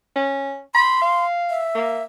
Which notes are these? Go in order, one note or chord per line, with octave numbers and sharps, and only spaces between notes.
C#4
B5 C6
F5
E5
A#3